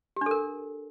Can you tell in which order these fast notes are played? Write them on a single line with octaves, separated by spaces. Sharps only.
G4 D4 A4 A#4